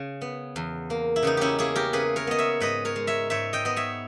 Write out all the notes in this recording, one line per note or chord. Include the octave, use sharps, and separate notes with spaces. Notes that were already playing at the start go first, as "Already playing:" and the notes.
Already playing: C#3
B3
E2
A#3
E4
C#3 B3 D#4
C#4 E4 G4
A#3 E4 G#4
G4 A#4
C#3 G#4 B4
A#4 C#5
B3 D#5
C#5 E5
G#2 B4 D#5
A#4 C#5
G#3
C#5 E5
G#2 C#5 E5
D#5 G5
B3 D#5
C#5 E5